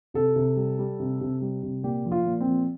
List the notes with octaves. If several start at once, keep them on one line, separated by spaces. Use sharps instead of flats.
C3 A4
C3
G3
G3
C3
C3
G3
C3
A#2 G4
F3
F4
A#2
C4
F3